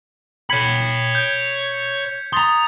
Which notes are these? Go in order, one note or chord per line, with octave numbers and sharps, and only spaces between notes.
C#5 B5 G#6 B6 C#7
G6
A#5 C6 D#6 A6